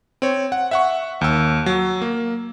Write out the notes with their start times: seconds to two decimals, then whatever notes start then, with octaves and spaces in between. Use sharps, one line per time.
0.22 C4 C#5
0.52 F#5
0.71 E5 F#5 C#6
1.21 D#2 E6
1.66 F#3
2.02 A#3